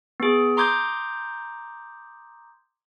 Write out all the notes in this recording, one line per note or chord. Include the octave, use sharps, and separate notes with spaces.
B3 G#4
A#5 C6 D6 D#6 G6 G#6